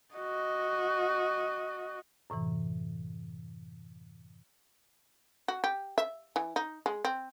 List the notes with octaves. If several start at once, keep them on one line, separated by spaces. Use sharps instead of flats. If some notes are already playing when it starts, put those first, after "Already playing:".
F#4 D#5
F#2 A2 C3 E3
F#4
G4
E5
E3
D#4
G#3
C4